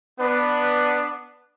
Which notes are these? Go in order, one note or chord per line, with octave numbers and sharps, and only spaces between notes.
B3 D4 B4